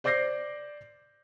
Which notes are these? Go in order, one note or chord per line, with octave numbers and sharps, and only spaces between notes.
C5 D5 D6 G6 A#6 C7